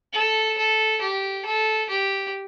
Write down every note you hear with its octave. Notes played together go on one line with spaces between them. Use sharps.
A4
A4
G4
A4
G4